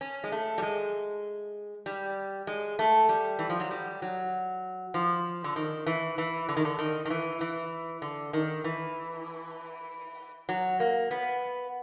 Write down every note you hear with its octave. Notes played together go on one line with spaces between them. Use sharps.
C#4
G#3
A3
G3
G#3
G3
G#3
A3
G3
E3
F3
F#3
G3
F#3
F3
D3
D#3
E3
E3
D3
D#3
D3
D#3
D#3
E3
E3
D3
D#3
E3
F#3
A#3
B3